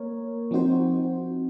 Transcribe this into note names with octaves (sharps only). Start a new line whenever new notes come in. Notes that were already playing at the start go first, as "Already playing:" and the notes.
Already playing: A#3 A#4 C#5
F3 C4 D#4 F#4 C5